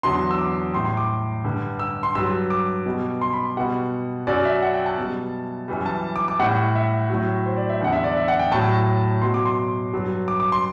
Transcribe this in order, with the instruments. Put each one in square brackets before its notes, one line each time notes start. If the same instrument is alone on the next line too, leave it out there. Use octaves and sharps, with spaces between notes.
[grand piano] E2 D3 F#3 C6
E6
D6
A2 G3 C6
C6
D6
G2 D3 G3
E6
C6
G2 F#3 E6
D6
B2 G3
C6
B5
B2 G3 F#5
F#2 F#3 D5
E5
F#5
G5
A5
B2 G3
F#2 E3 G3
A5
D6
D6
A2 G3 F#5
E5
A2 F#3
C5
D5
E5
E2 D3 G3 F#5
E5
D5
E5
F#5
G5
A2 F#3 A5
B2 F#3 C6
D6
C6
G2 F#3
D6
D6
C6